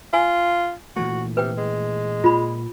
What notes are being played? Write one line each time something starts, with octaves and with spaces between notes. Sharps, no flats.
F4 G#5
A#2 E3 A3 F#4
C3 B4 G5
G#3
A#2 F4 B5